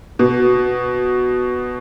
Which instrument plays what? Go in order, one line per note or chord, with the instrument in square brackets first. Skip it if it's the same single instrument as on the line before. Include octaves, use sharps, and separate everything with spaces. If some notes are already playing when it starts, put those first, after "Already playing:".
[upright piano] B2